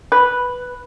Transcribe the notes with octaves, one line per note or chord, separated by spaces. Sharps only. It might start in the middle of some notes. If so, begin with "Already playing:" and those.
B4